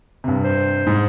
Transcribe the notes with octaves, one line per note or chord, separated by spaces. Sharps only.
G2 C3
C5
G#2